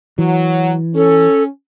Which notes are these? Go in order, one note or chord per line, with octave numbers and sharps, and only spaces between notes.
E3 F#3
C#4 A4